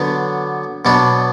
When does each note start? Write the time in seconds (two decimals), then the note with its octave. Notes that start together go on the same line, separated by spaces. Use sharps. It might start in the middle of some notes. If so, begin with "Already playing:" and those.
Already playing: D3 F#3 B3 D4
0.85 B2 F#3 B3 D4